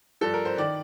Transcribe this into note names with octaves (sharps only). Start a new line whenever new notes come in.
G2 F3 A4
A#4
C5
D#3 D5